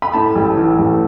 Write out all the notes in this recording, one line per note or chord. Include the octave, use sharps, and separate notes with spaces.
B5
A2 A5
A1
E3
A1